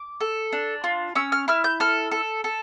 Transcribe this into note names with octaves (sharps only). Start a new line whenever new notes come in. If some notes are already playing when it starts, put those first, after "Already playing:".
Already playing: D6
A4
D4
F4
C#4 E6
F6
E4 F6
G6
A4 F6
A4
A4